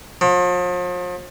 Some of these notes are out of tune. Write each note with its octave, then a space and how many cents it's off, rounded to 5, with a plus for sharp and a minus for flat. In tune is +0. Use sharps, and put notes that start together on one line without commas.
F3 +40